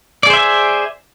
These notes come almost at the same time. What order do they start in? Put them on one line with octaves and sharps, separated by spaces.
D5 G#4 C5 E5 G#5